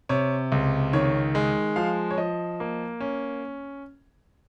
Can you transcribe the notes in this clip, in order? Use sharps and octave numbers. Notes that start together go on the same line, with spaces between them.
C3 C#5
C#2
D#3 C#5
G#3
F3 F5
C#5
F3 D#5
A#3
C#4